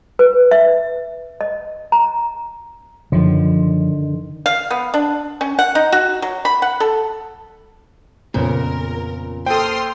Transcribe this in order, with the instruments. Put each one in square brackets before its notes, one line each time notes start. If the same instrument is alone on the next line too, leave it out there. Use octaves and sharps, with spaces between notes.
[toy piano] B4
E5
D#5
A#5
[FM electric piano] F#2 F3 [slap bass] D3 D#3
[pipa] F5
B3
D4
C#4
F#5
D#4
F#4
F#3
B5
F#5
A4
[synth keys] F2 C#3 B3 [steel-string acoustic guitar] A#2 [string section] A#4
[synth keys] A#3 C5 [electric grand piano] A4 G5 [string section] C6 D#6 F6